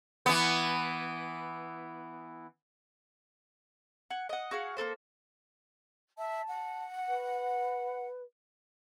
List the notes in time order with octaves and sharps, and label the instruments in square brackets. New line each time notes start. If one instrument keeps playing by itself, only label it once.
[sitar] E3 B3
[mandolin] F#5 G#5
D#5 F#5
F#4 G#4 F5 F#5
A#3 C4 A4 C5
[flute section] E5 [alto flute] A5
[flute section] F#5
[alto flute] B4